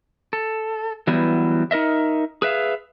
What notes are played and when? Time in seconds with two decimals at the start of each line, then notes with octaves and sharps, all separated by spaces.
0.33 A4
1.07 E3 F#3 G3 B3 E4
1.71 D#4 A#4 D#5 E5
2.42 G#4 B4 E5 F5